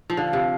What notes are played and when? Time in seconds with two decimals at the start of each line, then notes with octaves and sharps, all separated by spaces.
0.10 F3
0.17 D3 F5
0.33 C3